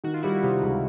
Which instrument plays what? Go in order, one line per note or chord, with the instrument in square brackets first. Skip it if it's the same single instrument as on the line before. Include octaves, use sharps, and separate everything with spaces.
[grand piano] D#3 [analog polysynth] F#4
[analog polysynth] F4
[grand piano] G3 [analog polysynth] E4 F#4
[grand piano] C3 [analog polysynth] D#4 F4
[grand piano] C#2